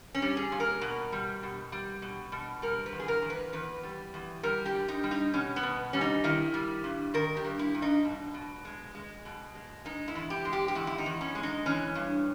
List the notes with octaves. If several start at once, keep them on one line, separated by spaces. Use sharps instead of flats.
C#4
G3
G#4
A#2
A#4
B2
G3
B2
G3
B2
B2
G3 A#4
B4
E2
G#4
A#4
E2
B4
E2 B4
G3
E2
G3 A#4
G4
G3
D#4
G3
D#4
B2 C#4
B3
B2
G3 C#4
D#4
D#3 E4
G3
G2
D#3 A#4
G4
G2
E4
G2
D#4
B2
B2
G#3
G#3
B2
G#3
G#3 D#4
E4
E2
G4
G#3
G4
G4
E2 E4
E4
D#4
E2
C#4
G#3
D#4
E3 C#4
G2